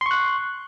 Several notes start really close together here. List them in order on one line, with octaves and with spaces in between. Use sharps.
C6 C#6 F#6